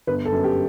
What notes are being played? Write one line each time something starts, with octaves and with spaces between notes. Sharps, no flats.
G1 B4
A4
F#2
G4